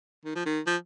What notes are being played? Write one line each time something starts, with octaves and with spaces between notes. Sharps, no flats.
D#3
F3
D#3
F3